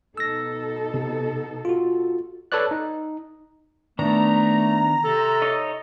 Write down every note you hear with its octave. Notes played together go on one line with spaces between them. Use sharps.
B2 D#4 A4 E6 A#6
C3
F4 F#4
A4 B4 C#5 D5 F#6
D#4
D#3 A3 B3 D4 A#5
C3 A4
D#4 C#5 D#5